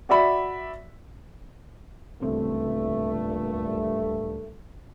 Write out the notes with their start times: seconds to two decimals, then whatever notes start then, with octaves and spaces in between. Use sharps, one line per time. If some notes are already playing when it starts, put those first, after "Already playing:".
0.09 F#4 D5 E5 B5
2.21 D1 C#2 G2 A#2 A3 C4